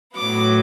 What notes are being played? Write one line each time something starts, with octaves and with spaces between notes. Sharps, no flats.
A2 F#3 B3 D6